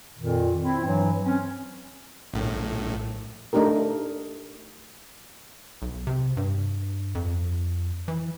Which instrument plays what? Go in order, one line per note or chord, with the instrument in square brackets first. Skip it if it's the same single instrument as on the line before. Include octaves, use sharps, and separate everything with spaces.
[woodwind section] F2 A#2 D#3
C4 E4
G2 E3 F#3
C4 C#4
[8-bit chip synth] A#1 A2
[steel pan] A3 D4 D#4 G4 A#4
[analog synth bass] B1
C3
G2
F2
E3